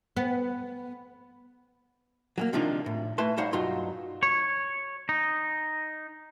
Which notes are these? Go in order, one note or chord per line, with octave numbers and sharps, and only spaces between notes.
B3
F#3 G#3 A#3
C3 D#3 F3 D4 D#4 F4
A2
A3 E4 B4 A5 C6
G3 D#4 C5 C#5 F5 F#5
B1 G2 F#3 D#4 F4 C6
C#5
D#4